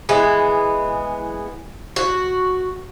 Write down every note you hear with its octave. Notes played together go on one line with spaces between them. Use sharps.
E3 G#3 B3
F#4